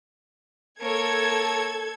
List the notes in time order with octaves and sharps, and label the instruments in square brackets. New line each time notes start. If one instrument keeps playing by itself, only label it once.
[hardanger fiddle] A#3 C#5 [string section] A4 G#6